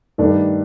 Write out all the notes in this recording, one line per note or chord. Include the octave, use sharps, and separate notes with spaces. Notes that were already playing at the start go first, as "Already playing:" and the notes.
G2 D#3 A3 D4 A4